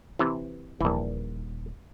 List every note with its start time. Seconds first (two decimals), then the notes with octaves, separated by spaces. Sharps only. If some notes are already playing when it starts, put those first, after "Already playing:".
0.19 C3 E3
0.81 D#1 A#1 E3 D#4